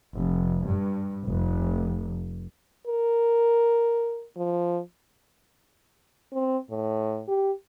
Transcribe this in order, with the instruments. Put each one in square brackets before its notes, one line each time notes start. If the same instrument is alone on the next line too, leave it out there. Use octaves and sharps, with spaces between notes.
[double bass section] F1
G2
F1
[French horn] A#4
F3
C4
A2
G4